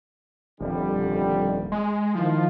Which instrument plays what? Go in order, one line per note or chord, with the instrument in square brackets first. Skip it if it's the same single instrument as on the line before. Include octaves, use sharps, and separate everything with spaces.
[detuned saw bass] D#1 [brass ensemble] F2 D3 G3
[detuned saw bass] G#3
[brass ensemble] D#3 E4 F4 [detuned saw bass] F3